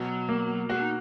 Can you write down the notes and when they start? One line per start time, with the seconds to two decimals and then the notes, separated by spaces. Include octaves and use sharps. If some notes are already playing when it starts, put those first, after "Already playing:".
Already playing: B2 F#3
0.29 A#3
0.70 G#3 F#4
0.81 D#4